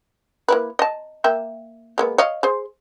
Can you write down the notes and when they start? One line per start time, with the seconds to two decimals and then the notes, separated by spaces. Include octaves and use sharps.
0.48 A#3 E4 B4
0.79 D#5 A5
1.24 A#3 E5 G5
1.98 G#3 A#3 B3
2.18 C#5 D#5 F5
2.43 G#4 C5